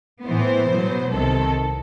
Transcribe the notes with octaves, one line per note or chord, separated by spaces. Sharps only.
A2 E3 B3 C5
B2 F#3 B3
C2 C3 D#3 A4